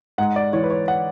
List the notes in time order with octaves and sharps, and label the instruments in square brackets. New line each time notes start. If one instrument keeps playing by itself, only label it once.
[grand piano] G#2 F#5
D5
E3 C#5
B4
C#5
F#5